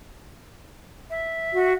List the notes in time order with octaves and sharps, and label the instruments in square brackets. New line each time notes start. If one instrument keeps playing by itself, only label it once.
[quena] E5
[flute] F#4